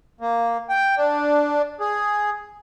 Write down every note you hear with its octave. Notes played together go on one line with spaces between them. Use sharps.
A#3
G5
D4
G#4